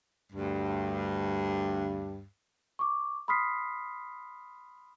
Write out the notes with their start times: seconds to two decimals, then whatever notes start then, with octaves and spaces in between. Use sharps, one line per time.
0.33 D2 G2
2.79 C#6 D6
3.28 B5 C6 D#6 F6 B6 C7